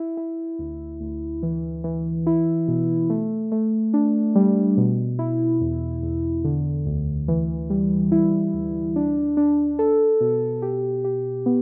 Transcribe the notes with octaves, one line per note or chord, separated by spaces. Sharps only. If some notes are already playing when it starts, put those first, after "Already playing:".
Already playing: E4
E4
D2
D2
E3
E3
E4
B2
A3
A3
D4
G3
B2
E4
E2
E2
D3
D2
E3
G3
E4
D2
D4
D4
A4
B2
G4
G4
B3